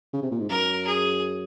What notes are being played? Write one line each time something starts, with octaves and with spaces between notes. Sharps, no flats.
C#3
C3
A#2
G#2
F#2 A#4
G#4